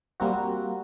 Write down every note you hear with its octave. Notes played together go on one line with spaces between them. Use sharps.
G3 A#3 C4 F#4